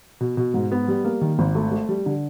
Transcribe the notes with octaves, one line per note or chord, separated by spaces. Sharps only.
B2
B2
G#2
B3
G3
A#3
D#3
G#1
A3
A3
G3
D3